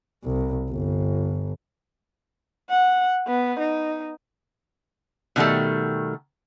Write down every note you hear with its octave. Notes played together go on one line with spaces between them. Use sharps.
C2
G1
F#5
B3
D#4
B2 D#3 F#3 G3 A3